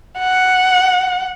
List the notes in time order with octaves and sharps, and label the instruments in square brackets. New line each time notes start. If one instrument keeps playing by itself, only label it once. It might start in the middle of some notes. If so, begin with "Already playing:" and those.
[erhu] F#5